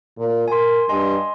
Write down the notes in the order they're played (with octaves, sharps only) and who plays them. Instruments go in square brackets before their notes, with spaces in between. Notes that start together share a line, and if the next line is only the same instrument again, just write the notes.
[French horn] A#2
[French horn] A#4 [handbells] G#5 C6
[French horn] G2 [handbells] D#5 G#5 C6